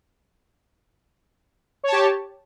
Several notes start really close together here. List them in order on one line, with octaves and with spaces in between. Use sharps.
C#5 A5 G4